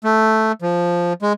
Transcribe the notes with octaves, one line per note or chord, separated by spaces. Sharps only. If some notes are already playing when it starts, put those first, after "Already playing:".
A3
F3
G#3